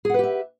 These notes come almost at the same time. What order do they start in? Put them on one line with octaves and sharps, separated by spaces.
G#4 F#5 B4 G4 E5